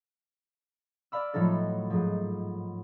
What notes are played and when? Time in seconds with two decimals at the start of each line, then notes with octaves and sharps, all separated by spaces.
1.12 D5 F5 B5 E6
1.34 A2 F3 F#3 D#4 A4
1.90 G#2 F3